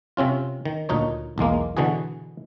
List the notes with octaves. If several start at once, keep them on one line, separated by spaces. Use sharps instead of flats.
C3 C4 C#4 F4
D#3
D2 A#2 D#4 C#5
B1 E2 G#3 A#3
B2 D3 E3 B3 F#4 G#4